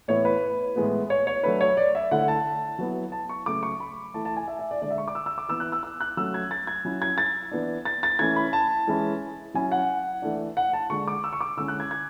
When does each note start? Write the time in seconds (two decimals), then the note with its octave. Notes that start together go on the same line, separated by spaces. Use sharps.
0.08 A2 E3 B3 E4 C#5
0.25 B4
0.76 A2 E3 G#3 B3
1.10 C#5
1.27 C#5
1.43 F#3 A3 D4 B4
1.61 C#5
1.77 D5
1.95 E5
2.11 D3 A3 E4 F#5
2.28 A5
2.79 F#3 B3 E4
3.12 A5
3.29 C#6
3.46 C#3 F#3 A3 D6
3.63 C#6
3.80 B5
4.14 E3 A3 E4 A5
4.25 A5
4.37 G#5
4.48 E5
4.59 E5
4.71 D5
4.81 D3 G#3 D4 D5
4.91 E5
4.98 C#6
5.08 D6
5.15 E6
5.26 E6
5.38 D6
5.49 E3 B3 E4 E6
5.60 F#6
5.72 E6
5.83 E6
6.01 F#6
6.17 F#3 A3 C#4 E6
6.34 G#6
6.51 A6
6.67 G#6
6.85 F#3 C#4 E4
7.02 G#6
7.18 A6
7.51 E3 B3 D4
7.85 A6
8.03 A6
8.19 E3 A3 C#4 E4 G#6
8.36 B5
8.53 A5
8.87 E3 G#3 C#4 E4
9.54 F#3 C#4 E4 G#5
9.72 F#5
10.22 E3 A3 D4
10.57 F#5
10.73 A5
10.90 D3 G#3 D4 C#6
11.08 D6
11.24 E6
11.33 C#6
11.41 D6
11.57 D3 G#3 C#4 E4 E6
11.68 F#6
11.80 G#6
11.91 G#6